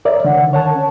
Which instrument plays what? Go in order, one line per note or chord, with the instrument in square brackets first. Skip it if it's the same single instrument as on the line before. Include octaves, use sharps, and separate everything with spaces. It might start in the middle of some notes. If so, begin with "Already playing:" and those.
[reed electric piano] A#4 D5 E5 [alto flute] C#5
[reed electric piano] D3 D#3 [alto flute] F#5
[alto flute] A#4 [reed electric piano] C#5 F#5 A5
[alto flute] C#4